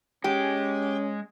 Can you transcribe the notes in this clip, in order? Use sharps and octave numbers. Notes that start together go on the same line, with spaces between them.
G#3 C#4 G4